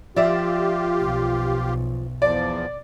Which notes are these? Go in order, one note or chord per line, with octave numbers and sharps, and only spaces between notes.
F3 F4 G4 D5 E5
B1
E2 F3 D5